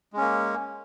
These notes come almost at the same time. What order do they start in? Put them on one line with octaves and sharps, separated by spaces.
G#3 C#4 A#3